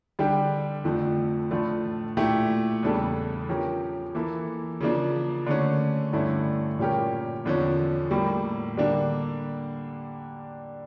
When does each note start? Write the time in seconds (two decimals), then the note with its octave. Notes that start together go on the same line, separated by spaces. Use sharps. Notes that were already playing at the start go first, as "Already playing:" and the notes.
0.19 D3 G3 D4 G4
0.85 F2 D3 F3 A3
1.51 A2 F3 A3 D4 F4
2.17 A#2 A3 E4 G4
2.83 E2 C#3 G3 D4 A4
3.49 F3 C#4 G4 A#4
4.15 E3 A#3 E4 A4
4.81 C#3 F3 A#3 D4
5.47 D3 A3 C#4
6.13 G2 D3 A3 C#4 E4
6.79 A#2 G3 C#4 G4 A#4
7.45 E2 D3 F3 C#4
8.11 A2 G3 A#3
8.77 D3 G3 A#3 D4